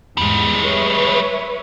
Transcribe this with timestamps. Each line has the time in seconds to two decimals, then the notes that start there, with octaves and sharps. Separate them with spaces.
0.18 E2 G#2 G3 G#3
0.60 B4 C#5 E5